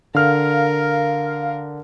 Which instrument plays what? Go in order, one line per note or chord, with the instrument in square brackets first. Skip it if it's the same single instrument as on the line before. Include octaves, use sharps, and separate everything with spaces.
[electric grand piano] D3 F6 [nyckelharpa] A#4 [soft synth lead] F5